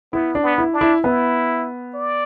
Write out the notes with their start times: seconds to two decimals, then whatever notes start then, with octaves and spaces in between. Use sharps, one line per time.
0.13 B3 E4
0.35 D4
0.43 B3
0.58 E4
0.74 D4
0.81 E4
1.04 B3 E4
1.95 D5